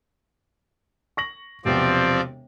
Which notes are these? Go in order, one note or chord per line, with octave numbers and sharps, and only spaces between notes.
C#6 A#6 F#7
E1 C3 F3 B3 C4 D5